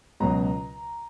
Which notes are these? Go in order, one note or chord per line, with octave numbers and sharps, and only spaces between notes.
C#2 B2 F#3 A#5